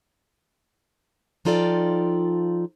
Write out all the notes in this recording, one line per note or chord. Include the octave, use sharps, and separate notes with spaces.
F3 D#4 F4 A4 D5 G5